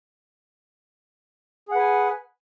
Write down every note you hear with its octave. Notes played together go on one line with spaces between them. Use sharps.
G#4 B4 F#5 G#5